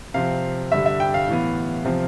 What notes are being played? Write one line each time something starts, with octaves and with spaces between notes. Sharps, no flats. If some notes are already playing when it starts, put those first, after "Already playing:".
C3 F3 C4 F5
G2 D3 G3 E5
E5
G5
F5
A2 E3 B3
C3 F3 C4